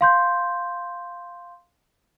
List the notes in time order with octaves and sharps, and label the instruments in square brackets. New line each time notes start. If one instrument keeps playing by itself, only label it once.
[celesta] F5 C6 G6